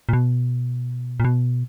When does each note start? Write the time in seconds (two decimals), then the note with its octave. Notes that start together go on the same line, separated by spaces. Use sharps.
0.09 A#2
0.13 B2
1.20 A#2
1.25 B2